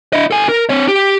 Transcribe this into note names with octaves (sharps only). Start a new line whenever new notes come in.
E4 D#5
A4 G#5
A#4
C4 C#5
G4